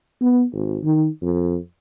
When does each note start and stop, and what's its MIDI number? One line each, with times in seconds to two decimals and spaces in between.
0.21 0.43 59
0.53 0.77 32
0.84 1.07 51
1.22 1.57 41